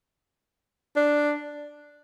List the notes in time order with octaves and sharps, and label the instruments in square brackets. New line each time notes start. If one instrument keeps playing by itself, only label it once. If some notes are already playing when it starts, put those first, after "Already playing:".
[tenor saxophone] D4